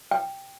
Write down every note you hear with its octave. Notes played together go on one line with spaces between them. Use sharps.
G5